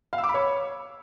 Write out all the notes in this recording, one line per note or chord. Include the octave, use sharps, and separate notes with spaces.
F5
E6
D6
B5
C#5